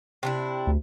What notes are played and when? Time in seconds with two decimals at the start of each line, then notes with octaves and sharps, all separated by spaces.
0.23 C3 D4 E4
0.67 D2